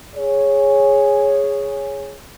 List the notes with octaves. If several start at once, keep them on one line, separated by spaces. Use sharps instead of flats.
G#4 C#5